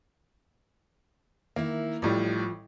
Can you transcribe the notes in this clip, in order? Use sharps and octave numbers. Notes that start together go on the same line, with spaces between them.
D#3 A#3 E4
A1 A2 F3 G3